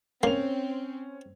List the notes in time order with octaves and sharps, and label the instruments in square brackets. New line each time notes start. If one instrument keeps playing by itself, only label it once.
[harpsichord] A#3 [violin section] C4 [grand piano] C#4 F7